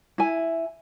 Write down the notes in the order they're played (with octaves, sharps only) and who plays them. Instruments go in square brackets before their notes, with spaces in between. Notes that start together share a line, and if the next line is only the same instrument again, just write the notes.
[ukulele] E4 G#5